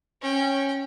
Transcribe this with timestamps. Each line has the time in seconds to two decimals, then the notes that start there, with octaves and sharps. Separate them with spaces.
0.21 C#4 G5